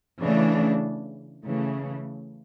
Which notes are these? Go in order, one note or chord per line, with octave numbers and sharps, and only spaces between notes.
C#3 E3 A3 D4
C#3 E3 A3